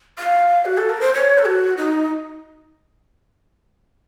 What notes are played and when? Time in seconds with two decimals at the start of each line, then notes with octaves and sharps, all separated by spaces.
0.19 F5
0.65 F#4
0.77 A4
0.89 A#4
1.01 C5
1.14 C#5
1.38 A4
1.45 F#4
1.77 D#4